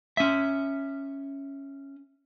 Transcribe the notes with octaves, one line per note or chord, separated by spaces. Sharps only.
C#4 E5